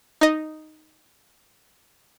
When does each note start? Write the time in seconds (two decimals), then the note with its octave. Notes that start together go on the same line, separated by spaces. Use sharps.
0.21 D#4 D#5